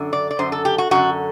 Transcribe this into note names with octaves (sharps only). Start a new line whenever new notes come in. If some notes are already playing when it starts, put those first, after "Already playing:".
Already playing: F#2 D3
D5
D5
F#2 D3 C5
A4
G4
F#4
F#2 D3 F#4